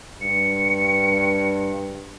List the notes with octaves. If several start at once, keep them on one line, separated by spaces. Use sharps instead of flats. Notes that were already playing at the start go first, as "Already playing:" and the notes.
G2 C#7